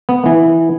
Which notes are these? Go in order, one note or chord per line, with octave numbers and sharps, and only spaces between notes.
B3
E3